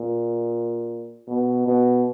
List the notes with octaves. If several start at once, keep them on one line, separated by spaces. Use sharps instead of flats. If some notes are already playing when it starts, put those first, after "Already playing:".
Already playing: A#2
B2
B2